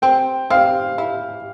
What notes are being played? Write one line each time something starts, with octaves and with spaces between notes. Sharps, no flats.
C4 G5
C4 F5
E4